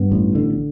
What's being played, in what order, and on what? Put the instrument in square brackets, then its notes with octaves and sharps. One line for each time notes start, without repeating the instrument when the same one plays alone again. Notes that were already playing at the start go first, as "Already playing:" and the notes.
Already playing: [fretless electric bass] G2 B3
A1
D3